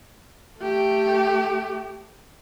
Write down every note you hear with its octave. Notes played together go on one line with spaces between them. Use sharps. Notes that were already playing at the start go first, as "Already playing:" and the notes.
A3 G4